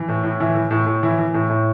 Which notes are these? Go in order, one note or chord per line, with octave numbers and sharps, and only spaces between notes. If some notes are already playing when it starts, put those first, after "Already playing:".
Already playing: E3
A2
A2
E3 E4
E3
A2
A2
E3 E4
E3
A2
A2